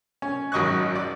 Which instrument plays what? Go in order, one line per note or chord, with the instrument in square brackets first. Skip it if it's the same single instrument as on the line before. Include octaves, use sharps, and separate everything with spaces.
[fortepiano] C#4
G#1 F#2 D#5 C#6 F#6
D5